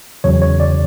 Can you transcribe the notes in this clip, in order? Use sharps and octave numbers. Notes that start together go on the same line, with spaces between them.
E2 C#3 F#3 C#5
C#5
D5